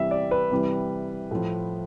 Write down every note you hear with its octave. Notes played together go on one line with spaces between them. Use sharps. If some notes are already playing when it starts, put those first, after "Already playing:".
Already playing: C3 E3 G3 E5
D5
B4
C3 E3 G3
A2 F3